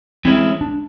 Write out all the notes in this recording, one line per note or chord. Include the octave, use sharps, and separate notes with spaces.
E3 G#3 C4 C#4 E4
D4